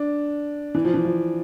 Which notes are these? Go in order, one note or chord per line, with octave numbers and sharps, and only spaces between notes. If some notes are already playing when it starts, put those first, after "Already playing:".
Already playing: D4
E3
F3
E3
F3